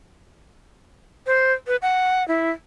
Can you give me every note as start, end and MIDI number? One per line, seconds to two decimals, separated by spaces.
1.26 1.53 72
1.67 1.76 71
1.82 2.26 78
2.28 2.50 64